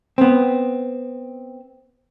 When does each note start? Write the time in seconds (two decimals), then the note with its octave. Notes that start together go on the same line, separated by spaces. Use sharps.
0.18 B3 C4